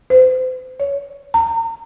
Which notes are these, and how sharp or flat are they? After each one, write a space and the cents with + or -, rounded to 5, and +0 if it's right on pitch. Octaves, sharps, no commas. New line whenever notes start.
C5 -35
C#5 +20
A#5 -35